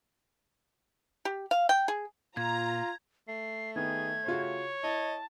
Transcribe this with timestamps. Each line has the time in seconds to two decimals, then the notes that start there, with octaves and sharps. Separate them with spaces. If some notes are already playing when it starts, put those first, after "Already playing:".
1.25 G4
1.51 F5
1.69 G5
1.88 G#4
2.37 A#2 F4 A#5 G#6
3.28 A3 C7
3.76 D#3 B3 G#4 G#6
4.26 C#3 F4 F#4 C#5
4.83 E4 D#5 A5